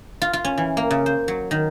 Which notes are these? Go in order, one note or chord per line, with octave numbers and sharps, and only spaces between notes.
F4
F4
C#4
E3
A#3
C#3
C5
F#3
D#3